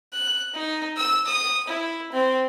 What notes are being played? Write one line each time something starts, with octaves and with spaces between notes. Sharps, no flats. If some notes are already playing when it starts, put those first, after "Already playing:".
F#6
D#4
E6
D#6
E4
C4